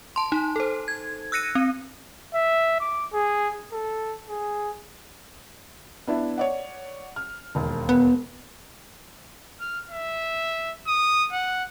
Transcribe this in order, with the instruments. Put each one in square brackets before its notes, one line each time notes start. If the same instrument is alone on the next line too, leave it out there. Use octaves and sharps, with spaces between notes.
[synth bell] A5 C6
D#4
A4 C5
G#6
E6 F#6 A#6 C#7 D#7
C4
[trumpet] E5
D6
G#4
A4
G#4
[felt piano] B3 D4 E4
C#5 D5 F#5
F6
E1 D#2
[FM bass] B3
[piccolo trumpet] F6
E5
D#6
F#5